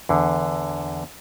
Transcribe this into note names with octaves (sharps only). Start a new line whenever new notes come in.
E2 D3